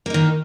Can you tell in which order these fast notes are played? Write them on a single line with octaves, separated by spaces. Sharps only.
A#3 D#4 D#3